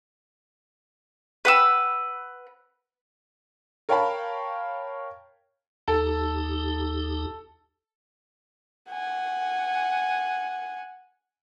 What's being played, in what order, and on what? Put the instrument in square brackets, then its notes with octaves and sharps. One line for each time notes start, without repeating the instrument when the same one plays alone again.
[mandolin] B4 F#5 E6
[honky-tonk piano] A#4 C#5 F5 G5 A5 B5
[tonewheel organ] D#2 D#4 G4 [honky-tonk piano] A4
[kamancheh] F#5 G#5